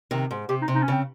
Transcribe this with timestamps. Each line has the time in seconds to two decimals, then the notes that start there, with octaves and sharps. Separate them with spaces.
0.11 C3 D#3
0.31 G#2
0.49 C3 G4
0.62 D#4
0.68 C3
0.75 D#4
0.83 C#4
0.88 C#3 C4